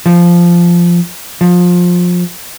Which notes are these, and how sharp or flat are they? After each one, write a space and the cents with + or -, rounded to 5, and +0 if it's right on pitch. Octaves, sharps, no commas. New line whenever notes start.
F3 -10
F3 +25